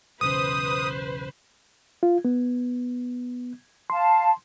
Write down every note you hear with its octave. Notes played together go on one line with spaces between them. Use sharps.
B1 E2 C#3 B4 C5 D#6
F4
B3
F5 A5 C6